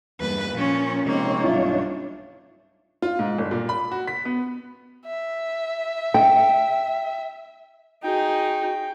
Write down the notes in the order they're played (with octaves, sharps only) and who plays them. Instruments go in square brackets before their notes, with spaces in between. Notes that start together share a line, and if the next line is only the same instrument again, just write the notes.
[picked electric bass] E2 G2 A#3 [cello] B4
[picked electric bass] A#2 [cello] F3 C#4
[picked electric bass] C3 F3 G#3 [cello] A#3 C4 [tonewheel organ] C#4 D#4 C#5
[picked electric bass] B1 G2 [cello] D4 [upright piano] F4 E5
[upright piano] F4
G#2
G1
A#2
B5
F#4
B6
B3
[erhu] E5
[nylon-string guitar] G5
[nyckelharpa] D#4 G#4 [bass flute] F#4 [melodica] G5